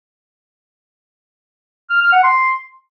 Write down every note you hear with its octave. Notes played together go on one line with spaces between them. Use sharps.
F6
F6
F#5
C6